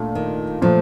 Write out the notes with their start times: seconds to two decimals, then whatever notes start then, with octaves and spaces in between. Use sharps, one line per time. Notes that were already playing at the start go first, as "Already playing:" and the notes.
Already playing: A#2 A3 D4
0.15 D#3
0.62 A#2 F3 A3